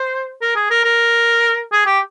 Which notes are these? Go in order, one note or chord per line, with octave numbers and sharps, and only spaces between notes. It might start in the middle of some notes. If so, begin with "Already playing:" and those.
Already playing: C5
A#4
G#4
A#4
A#4
G#4
G4